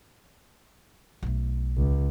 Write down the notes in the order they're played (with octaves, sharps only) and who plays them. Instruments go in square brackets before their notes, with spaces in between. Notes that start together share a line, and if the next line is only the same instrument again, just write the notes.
[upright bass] B1 A3
[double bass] C#2